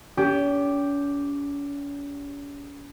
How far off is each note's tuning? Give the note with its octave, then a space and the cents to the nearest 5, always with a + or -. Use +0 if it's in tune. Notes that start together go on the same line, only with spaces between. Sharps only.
C#4 +45 G4 +0